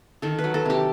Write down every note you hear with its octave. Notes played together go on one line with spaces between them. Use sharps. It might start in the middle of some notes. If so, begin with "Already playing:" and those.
D#3 A4
B4
F#3
A4
C3 G4